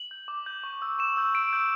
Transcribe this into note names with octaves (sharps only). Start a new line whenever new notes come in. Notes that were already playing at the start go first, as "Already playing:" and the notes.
Already playing: F#7
G6
D6
G6
C#6
E6 G6
C#6 E7
E6 G6
C#6 D7
E6 G6